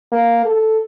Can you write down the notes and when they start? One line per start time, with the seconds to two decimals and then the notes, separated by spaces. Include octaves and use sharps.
0.12 A#3
0.45 A4